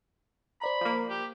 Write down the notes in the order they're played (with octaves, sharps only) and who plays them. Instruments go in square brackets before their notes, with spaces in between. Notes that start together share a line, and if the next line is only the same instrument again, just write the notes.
[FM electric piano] C5 D5 A#5 [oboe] B5
[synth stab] F3 A#3
[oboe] G4